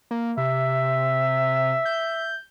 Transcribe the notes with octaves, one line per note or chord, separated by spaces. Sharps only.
A#3
C3 E5
G6